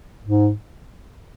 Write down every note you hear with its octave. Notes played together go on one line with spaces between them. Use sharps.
G#2